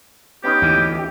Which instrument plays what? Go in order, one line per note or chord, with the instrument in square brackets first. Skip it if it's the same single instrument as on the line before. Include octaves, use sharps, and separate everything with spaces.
[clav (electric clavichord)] B3 C#4 D#4 [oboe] G4
[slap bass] D2 E3
[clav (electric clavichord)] E4 G4